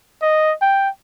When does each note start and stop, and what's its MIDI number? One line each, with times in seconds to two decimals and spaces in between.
0.22 0.54 75
0.62 0.89 79